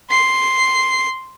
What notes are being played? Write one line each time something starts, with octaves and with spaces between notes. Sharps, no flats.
C6 C7